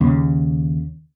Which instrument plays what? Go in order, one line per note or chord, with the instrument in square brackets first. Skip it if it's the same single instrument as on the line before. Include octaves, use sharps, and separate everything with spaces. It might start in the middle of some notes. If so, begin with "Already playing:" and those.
[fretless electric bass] D#2 C#3